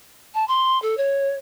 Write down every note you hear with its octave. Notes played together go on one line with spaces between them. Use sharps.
A5
C6
A4
C#5